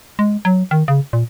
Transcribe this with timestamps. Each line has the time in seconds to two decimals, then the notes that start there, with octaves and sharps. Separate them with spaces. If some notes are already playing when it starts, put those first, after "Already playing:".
0.19 G#3
0.45 F#3
0.71 D#3
0.88 C#3
1.13 A#2